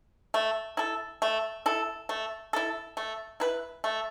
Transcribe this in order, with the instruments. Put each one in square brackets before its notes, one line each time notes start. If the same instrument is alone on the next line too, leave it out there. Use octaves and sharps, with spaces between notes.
[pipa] A3
E4 A4
A3
E4 A4
A3
E4 A4
A3
E4 B4
A3